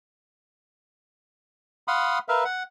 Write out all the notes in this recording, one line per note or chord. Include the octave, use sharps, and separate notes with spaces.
F5 F#5 B5 C6 D#6
A#4 B4 E5 F5
F#5